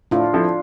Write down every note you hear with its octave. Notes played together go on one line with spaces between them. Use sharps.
A2 D4 F4
F3 C4 E4 A4